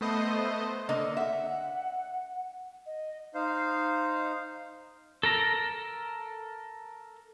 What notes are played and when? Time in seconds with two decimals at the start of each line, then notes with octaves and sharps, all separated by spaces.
0.01 A3 B3 C5 D#5
0.89 D3 A#3 D#5
1.17 E5 F#5
2.86 D#5
3.35 D#4 C5 F5
5.23 A4 A#4 A#5